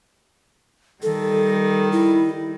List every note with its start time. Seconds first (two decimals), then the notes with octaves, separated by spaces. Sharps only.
1.03 D#3 G3 A4
1.92 E4